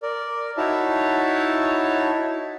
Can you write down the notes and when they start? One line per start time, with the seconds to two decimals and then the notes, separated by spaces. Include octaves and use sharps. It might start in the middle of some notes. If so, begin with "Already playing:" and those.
0.03 A#4 D5
0.57 D#4 E4 F#4 C#5 E5 A5